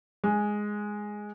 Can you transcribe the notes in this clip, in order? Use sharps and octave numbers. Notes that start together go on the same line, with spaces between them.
G#3